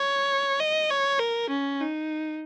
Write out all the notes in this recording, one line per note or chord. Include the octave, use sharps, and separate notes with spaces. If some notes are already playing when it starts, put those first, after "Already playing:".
Already playing: C#5
D#5
C#5
A#4
C#4
D#4